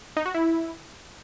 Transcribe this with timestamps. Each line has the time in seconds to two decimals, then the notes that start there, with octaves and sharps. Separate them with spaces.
0.17 D#4
0.26 F#4
0.34 E4